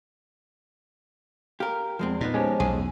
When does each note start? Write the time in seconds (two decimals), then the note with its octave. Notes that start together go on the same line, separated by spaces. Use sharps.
1.60 G4 A#4 F5
1.99 E2 F3 G#3 C4
2.21 A#2 B3 D#4
2.34 F3 G#3 C#4 G4
2.60 B1 E2 G#4